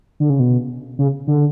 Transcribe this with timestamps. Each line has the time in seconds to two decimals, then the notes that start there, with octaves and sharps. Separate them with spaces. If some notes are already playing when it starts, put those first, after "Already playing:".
0.20 D3
0.30 C#3
0.40 B2
0.99 C#3
1.27 D3